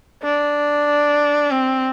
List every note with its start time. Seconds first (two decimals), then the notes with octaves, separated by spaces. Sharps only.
0.23 D4
1.51 C4